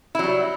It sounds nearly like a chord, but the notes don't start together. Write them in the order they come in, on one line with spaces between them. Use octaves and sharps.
E4 F#3 G3